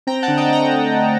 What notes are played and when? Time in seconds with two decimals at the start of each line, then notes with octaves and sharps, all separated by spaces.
0.07 C4 G5 A#5
0.23 F#5 A5
0.28 D3
0.37 D#5 G5
0.48 A3 G5 A#5